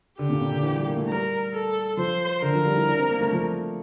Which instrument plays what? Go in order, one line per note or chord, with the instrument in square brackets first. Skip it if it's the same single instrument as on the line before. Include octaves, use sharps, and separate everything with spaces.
[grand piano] D3 [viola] G4
[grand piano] A#2
A#2
D3
E3
G3
A#3
A3
[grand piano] G3 [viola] A#4
[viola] A4
[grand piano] F3 [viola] C5
[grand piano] D3 [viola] A#4
[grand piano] F3
G3
E4
D4
C4
A#3
A3
F3